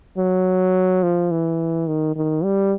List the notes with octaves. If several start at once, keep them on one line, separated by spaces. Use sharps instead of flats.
F#3
F3
E3
D#3
D#3
G3